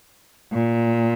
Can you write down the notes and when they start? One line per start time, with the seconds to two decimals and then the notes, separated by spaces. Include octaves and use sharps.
0.53 A#2